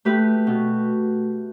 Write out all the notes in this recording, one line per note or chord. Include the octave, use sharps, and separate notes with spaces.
A3 G4 B4
B2